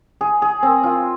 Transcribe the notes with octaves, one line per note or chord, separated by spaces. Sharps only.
G#4
G#4
C4
F4